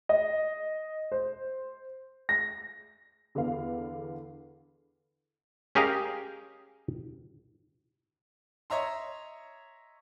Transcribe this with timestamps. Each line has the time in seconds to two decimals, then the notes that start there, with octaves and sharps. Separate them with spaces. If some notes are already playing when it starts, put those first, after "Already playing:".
0.09 D#5
1.12 C5
2.29 A#6
3.35 E2 D3 B4 F5
5.75 C#4 G4 G#4 A#4 D#5 F5
8.70 C#5 D#5 E5 A#5 C6